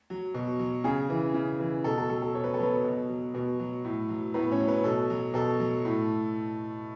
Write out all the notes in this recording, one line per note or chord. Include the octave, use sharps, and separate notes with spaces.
F#3
B2
F#3
C#3 G#4
E3
C#3
E3
B2 A4
A4
F#3 A4
A4
B2 C#5
B4
A4
F#3 B3 B4
B2
F#3
B2
F#3
A2
F#3
A2 B3 B4
C#4 C#5
F#3
B3 B4
B2 A4
F#3
B2 A4
F#3
A2